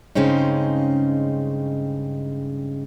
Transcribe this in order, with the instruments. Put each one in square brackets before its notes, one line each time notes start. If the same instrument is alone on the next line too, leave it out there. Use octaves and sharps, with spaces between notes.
[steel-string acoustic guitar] G2 C#3 G#3 C4 C#4 D#4